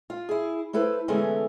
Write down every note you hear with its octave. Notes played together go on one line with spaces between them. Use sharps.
F4
E4 G#4
A3 E4 A4 B4 C5
D3 E3 G#3 A3 B3 C#4